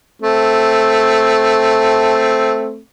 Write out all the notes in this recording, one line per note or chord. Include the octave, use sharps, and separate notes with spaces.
A3 C4